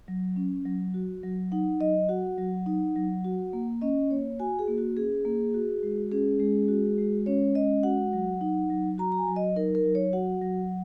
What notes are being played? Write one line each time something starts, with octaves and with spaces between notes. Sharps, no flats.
F#3
C#4
F#3
F#4
F#3
D#4 F#5
F#3 D#5
F#4 F#5
F#3
D#4
F#3
F#4
A#3
C#4 D#5
A#3 C#5
F#4 G#5
G#4
A#3
F#4
C#4 G#4
A#3
F#4
G#3
C#4 G#4
G#3
F#4
G#3
C#4 C#5
G#3 D#5
F#4 F#5
F#3
D#4
F#3
F#4 A#5
A#5
G#5
F#3
D#5
D#4 A#4
A#4
F#3
C#5
F#4 F#5
F#3